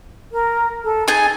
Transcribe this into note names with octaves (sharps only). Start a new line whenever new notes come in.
A#4
A4
D#4 G#4 G#5 A6